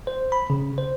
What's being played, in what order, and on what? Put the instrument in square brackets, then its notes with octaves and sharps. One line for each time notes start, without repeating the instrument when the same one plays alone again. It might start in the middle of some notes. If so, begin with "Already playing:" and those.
[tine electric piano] C5
B5
C#3
C5